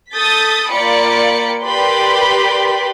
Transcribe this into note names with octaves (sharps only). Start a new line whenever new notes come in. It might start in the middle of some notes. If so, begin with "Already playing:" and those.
A4 D#6 G6 A6 B6
A#3 F4 D5 G5 B5 C#7
G4 A#4 B4 D5 B5 C6